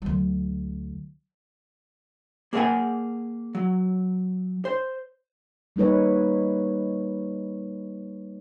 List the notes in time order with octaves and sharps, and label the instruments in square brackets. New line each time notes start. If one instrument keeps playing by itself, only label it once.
[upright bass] D2 F#3
[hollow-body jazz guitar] A#3 G#4 A#4 C#5 F#5 G#5
F#3
C5
[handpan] G3 A#3 D#4 B4 C#5